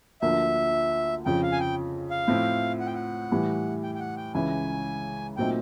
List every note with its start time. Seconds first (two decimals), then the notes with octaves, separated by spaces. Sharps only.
0.22 D2 D3 F3 A#3 E5
1.25 F2 C#3 F3 G5
1.43 F5
1.52 G#5
1.60 G5
2.11 F5
2.28 A2 F3 A3 C4 E4
2.80 F#5
2.87 G5
2.94 F#5
3.31 A2 E3 G3
3.83 G5
3.95 G5
4.00 F#5
4.17 G5
4.34 C#2 C#3 E3 G#5
5.36 A#2 F#3 A3 C4 D#4 G5